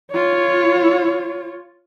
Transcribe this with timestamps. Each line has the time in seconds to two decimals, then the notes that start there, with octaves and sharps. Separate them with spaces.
0.13 F4 C#5